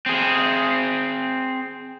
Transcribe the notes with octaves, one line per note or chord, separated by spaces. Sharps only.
C4 G#4